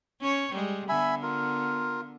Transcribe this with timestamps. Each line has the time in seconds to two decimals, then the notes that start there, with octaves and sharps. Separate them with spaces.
0.21 C#4 C#5
0.53 G3 G#3
0.89 D3 B3 E5 G#5 B5
1.23 F4 A#4